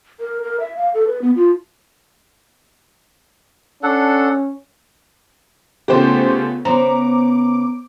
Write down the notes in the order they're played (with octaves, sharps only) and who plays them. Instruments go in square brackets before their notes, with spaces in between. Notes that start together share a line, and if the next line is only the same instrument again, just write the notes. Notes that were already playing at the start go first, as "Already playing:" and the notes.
[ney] A#4
A#4
E5
F5
A4
B4
B3
F4
[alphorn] C#4 [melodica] D4 A4 F#5
[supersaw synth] C#3 A3 C#4 [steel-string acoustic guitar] B3 F4 [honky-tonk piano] G4 C5
[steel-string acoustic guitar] C#3 B3 [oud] C5 [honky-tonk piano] A#5 [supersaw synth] D6